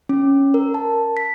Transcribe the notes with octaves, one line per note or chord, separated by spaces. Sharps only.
C#4
A#4
A5
B6